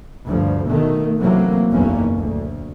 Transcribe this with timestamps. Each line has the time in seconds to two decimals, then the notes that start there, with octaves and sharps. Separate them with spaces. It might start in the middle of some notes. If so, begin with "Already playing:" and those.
0.27 D2 G2 F3
0.65 B2 D#3 A3
1.19 C3 E3 F#3 A3 A#3
1.70 F#1 B1 E2 B2 A#3 C#4
2.17 D2